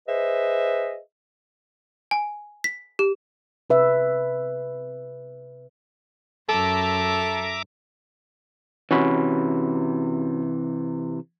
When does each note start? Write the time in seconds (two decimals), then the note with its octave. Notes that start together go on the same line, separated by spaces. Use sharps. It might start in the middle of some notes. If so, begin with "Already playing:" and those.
0.08 G#4 B4 C5 D#5 E5
2.11 G#5
2.64 B6
2.99 G4
3.70 C3 B4 E5
6.49 F#2 A4 E5 A#5 D6
8.91 C3 E3 C#4 F#4 B5